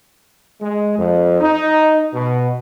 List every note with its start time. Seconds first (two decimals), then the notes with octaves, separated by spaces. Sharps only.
0.61 G#3
0.97 F2
1.41 D#4
2.13 B2